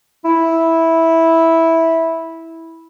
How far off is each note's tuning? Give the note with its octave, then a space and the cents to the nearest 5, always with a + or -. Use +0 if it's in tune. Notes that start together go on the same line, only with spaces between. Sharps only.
E4 -10